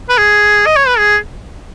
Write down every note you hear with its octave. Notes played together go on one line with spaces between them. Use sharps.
B4
G#4
D#5
C#5
B4
G#4